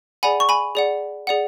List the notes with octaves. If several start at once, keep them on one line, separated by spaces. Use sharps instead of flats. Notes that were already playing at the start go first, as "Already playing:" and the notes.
G#4 D5 F#5 G#5 B5
C#6
G#5 B5
G#4 D5 F#5
G#4 D5 F#5